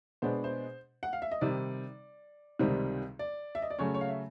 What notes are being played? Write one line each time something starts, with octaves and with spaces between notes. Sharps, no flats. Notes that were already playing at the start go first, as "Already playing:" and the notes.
B2 G#3 B3 D4 C5
C5
F#5
F5
E5
D#5
C3 D#3 G3 D5
C#2 C3 D#3 G3 C4
D5
E5
D#5
D5
C#3 F#3 A3 C#4 C#5
C#5
F5
E5